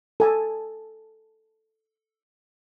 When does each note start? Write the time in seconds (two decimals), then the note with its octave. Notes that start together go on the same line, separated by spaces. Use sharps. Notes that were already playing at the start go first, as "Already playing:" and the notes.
0.20 A4 G#5 A5